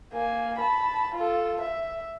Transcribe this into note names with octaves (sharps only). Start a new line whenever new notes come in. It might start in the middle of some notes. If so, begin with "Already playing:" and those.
A#3 G#5
A5 B5
F4 A4
E5